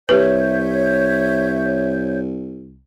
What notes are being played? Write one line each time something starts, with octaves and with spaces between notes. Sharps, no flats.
C2 G4 B4 C#5 E5 G6